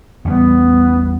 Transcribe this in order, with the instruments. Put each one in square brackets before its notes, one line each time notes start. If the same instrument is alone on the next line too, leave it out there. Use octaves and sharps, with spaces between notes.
[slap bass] A1 E2 G3 [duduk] B3